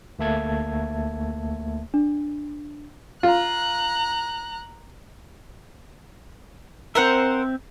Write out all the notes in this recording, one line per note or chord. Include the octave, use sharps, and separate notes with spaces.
D2 A3 A#3 E5 A5 G#6
D4
F4 A#5 F#6
C4 A#4 C5 E5 F#5